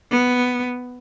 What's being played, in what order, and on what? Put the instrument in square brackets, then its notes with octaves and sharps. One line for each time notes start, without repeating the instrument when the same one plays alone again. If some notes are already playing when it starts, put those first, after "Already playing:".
[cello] B3